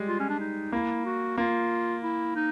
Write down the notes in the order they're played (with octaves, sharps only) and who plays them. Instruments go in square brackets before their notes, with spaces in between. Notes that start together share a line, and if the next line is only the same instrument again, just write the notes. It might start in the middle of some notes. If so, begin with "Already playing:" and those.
Already playing: [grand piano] G3 G#3
[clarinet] F4
C#4
D4
D#4
[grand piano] A#3 [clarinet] E4
[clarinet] F#4
[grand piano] A#3 [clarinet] F4
[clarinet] E4
D#4